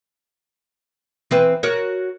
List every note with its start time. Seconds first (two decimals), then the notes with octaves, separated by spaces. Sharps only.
1.31 E3 C4 B4
1.63 F#4 A#4 C#5